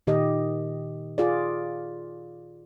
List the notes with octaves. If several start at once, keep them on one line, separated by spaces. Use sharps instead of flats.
A#2 D#3 G4 D#5
F4 G#4 D5